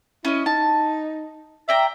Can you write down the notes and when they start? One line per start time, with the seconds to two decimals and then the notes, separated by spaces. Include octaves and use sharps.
0.25 C#4 E4 D#5
0.46 D#4 A5
1.69 D5 E5 G5 A#5